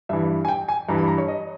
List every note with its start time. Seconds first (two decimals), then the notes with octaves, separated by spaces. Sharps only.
0.09 G2 E3 E5
0.45 G#5
0.48 G5
0.68 G#5
0.89 G2 E3 A#5
0.98 B5
1.08 A#5
1.18 C#5
1.28 D#5